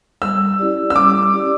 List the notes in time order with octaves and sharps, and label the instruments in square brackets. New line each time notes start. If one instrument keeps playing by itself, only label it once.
[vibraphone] G3 [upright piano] E6
[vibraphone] C#4 E4 G4 D5
[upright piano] E6
[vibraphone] G3 [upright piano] D6
[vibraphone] C#4 E4 G4 D5